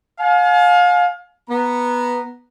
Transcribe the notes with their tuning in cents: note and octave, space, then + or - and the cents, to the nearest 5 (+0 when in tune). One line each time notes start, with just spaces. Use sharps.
F5 +30 G#5 +40
B3 -5 A#5 +0